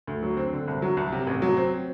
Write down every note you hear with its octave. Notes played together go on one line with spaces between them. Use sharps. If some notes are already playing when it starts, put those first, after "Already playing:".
D2
F#3
C4
D3
C2
F#3
C2
C3
A1
F#3
C4